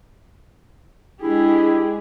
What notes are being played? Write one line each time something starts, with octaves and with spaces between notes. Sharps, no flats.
G#3 D4 E4 G4 G#4